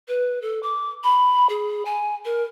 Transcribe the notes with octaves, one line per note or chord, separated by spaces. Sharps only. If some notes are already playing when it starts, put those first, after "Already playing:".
B4
A4
D6
B5
G#4
G#5
A#4